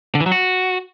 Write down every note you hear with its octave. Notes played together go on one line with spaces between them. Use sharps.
D3
E3
F#3
F#4